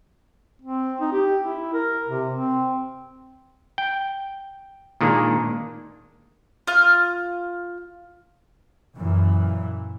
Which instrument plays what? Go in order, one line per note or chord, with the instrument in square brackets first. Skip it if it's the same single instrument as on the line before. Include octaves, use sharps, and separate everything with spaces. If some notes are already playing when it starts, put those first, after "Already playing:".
[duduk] C4
D#4
G4
E4
A#4
C3
C4
[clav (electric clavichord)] G5
A#2 D#3 G#3 A#3 D4
[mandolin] F4 F6
[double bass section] F#2 A#2 E3